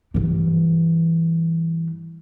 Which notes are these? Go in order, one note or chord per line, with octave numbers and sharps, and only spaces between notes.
G2 E3